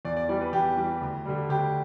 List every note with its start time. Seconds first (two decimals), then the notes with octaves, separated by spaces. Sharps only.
0.05 E2 D5
0.17 D5
0.29 E3 G3 D5
0.41 B4
0.53 E2 G4
0.77 E3 G3
1.01 D2
1.25 D3 G3
1.49 D2 G4